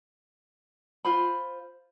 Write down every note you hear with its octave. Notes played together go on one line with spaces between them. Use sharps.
F4 C5 B5